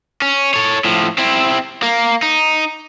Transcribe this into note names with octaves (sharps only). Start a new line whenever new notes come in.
C#4
A4 C#5
A2 F3
C4 E4
A#3
D#4